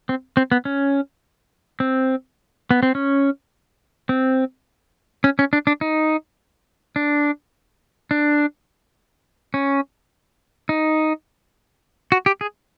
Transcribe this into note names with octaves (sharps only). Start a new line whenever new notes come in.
C4
C4
B3
C#4
C4
B3
C4
C#4
C4
C#4
C#4
D4
D4
D#4
D4
D4
C#4
D#4
F#4
G4
G#4